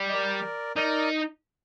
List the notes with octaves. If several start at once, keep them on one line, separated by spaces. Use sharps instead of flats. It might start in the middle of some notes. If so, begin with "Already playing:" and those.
Already playing: G3
D#5
A#4 D5
D#4 A#4 D5